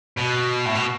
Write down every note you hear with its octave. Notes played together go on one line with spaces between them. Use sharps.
B2
A2
B2